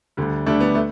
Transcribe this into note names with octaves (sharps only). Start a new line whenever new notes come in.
D2 D3 G3
D2 D3 G3 A3 D4
B3
A3